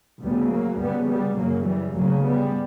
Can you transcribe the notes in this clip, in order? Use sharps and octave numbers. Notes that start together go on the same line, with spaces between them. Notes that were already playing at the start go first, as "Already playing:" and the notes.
D2 C#3 G3 B3
F#3 A#3
D2 C#3 G3 B3
G3 B3
F#2 C#3 F#3 A#3
E3 G3
D2 C#3 F#3 A#3
G3 B3